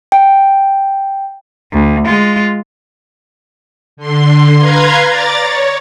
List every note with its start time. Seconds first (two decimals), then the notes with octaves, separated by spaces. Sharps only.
0.12 G5
1.72 D2
2.05 G#3 F4
3.97 D3 C6
4.57 B4 F5 A#5 C6 G#6
5.06 D5 A#5 A6
5.40 C#5